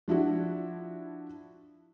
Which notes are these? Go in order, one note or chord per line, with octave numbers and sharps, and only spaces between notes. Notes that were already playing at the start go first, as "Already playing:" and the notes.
F3 D4 E4 F#4